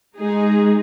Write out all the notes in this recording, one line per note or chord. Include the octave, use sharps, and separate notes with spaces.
G#3 D#4 G#4